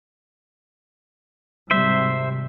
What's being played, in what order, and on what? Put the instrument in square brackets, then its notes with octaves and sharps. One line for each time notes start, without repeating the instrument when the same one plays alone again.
[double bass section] G#1 C3 G3 [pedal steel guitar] C5 E5